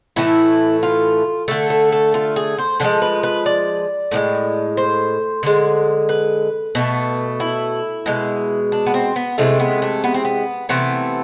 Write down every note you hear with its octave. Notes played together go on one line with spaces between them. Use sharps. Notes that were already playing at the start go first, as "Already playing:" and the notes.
A2 E3 A3 E4
F4
D3 A3 A4
A4
A4
F4
G#4
C5
D3 F3 G#3 A4
B4
B4
D5
A2 F3 G#3
C5
D3 G#3
B4
B2 A3
E4
B2 G#3
D4
B3
C4
B3
C3 E3 G#3 A3
B3
A3
B3
C4
B3
C3 E3 A3 B3